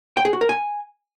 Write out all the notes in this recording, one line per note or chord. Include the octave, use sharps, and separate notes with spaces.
G5
G#4
F#4
A#4
G#5